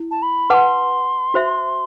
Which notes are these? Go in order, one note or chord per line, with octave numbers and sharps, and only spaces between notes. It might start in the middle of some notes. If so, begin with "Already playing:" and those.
Already playing: E4
A5
B5
B4 F#5 A5 C6 D6
F#4 C5 E5